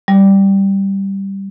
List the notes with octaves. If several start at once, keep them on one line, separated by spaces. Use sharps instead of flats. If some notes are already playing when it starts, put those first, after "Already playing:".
G3